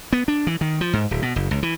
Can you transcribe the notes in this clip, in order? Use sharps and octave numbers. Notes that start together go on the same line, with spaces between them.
B3
D4
E3
D#3
F3
G#2
D1
B2
F#1
C#2
E3